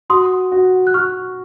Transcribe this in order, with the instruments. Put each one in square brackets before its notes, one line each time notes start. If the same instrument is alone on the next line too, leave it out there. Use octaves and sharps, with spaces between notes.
[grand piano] F#4 [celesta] C6 D#6
[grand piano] F#4
[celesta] F#6
[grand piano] F#4 [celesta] C#6 F6